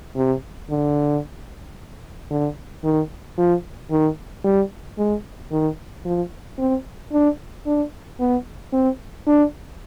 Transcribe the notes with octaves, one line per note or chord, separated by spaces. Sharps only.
C3
D3
D3
D#3
F3
D#3
G3
G#3
D#3
F3
C4
D4
D4
B3
C4
D4